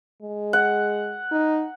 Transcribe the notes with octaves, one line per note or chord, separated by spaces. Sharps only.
G#3
F#5
D#4